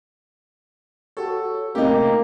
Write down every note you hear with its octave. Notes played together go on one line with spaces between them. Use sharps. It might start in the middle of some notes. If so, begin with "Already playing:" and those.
F#4 G4 A4 C#5
C3 A3 A#3 C#4 D#4 G4